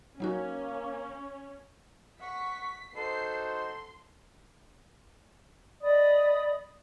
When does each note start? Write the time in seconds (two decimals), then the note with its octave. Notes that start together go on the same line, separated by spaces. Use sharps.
0.20 F#3 A#3 C#4 D#4 F#4
2.20 F#5 C#6 B6
2.95 D#4 F#4 A4 C5 C7
3.46 C6
5.82 D5 D#5 B5 D#6